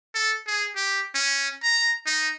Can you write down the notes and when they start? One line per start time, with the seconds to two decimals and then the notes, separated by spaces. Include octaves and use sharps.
0.15 A4
0.47 G#4
0.76 G4
1.14 C#4
1.63 A#5
2.06 D#4